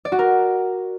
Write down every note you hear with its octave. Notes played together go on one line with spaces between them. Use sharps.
D5
F#4
A#4